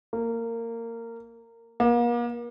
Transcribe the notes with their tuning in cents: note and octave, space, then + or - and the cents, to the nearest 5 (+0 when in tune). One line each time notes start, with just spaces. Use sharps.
A#3 -20
A#3 +40